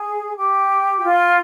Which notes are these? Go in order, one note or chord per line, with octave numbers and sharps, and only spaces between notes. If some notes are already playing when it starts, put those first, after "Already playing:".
Already playing: G#4
G4
F#4
F4